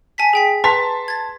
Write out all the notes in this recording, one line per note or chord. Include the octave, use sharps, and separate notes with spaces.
G#5 A5 B6
G#4 G5 B6
B4 A5 A#5 C6 B6
G#6 A6